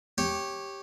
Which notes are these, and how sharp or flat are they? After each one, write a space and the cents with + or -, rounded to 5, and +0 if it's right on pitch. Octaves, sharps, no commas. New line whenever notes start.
G4 +0 C#5 -15